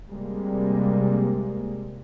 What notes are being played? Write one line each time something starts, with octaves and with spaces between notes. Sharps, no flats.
C3 G3 G#3 A#3